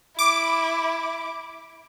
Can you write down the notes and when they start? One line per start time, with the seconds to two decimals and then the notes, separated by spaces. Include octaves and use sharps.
0.19 E4 D6